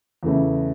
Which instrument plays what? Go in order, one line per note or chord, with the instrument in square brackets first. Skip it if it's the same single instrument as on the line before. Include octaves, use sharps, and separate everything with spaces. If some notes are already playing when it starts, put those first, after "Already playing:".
[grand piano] E2 C#3 E3 A3 E4